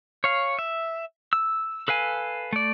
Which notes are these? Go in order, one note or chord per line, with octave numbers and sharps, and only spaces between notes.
C#5 F5
E5
E6
A4 B4 F5 G#5
A3 D5